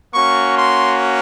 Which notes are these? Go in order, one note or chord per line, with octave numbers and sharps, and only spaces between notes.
A#3 C#4 F#4 C#6
C6